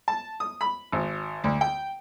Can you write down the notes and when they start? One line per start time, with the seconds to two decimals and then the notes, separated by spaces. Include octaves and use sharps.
0.08 A5
0.40 D#6
0.61 B5
0.92 G#1
1.44 D2
1.61 G5